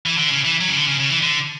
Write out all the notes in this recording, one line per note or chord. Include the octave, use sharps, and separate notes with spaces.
E3
D3
C#3
E3
F#3
C#3
D3
C#3
C#3
E3
D3